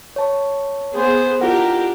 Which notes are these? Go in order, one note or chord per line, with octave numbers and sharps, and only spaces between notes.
C#5 A5 C#6
B3 G#4 C5
D4 E4 F4 G4 A#4 F#5